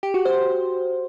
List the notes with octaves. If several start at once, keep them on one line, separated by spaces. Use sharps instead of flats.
G4
F#4
C5